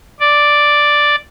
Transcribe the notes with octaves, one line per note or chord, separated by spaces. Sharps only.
D5